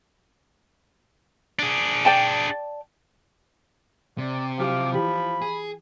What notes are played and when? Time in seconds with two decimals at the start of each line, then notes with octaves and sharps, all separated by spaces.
1.59 D4 G#4
2.05 D5 G5 A5
4.18 C3 D5
4.59 F3 F#3 E4 G4 F5 D6
4.93 E3 E4 G4 B5
5.42 G#4